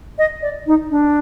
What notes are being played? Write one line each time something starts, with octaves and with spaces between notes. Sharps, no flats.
D#5
D5
D#4
D4